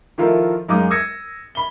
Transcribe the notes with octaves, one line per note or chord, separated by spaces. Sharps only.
D#3 F3 E4 F4 A4 A#4
F#2 G#3 D#4 F5 D6 D#6
D#6 E6 G#6 A#6 C#7
B5 G7